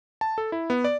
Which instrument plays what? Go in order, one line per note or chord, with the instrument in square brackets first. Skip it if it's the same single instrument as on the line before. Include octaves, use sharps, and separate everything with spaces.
[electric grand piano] A5
A4
E4
B3
D5